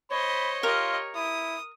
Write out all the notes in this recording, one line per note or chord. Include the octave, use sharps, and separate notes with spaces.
C5 C#5 D#5 B5
F4 G4 A#4 D#5
E4 D#6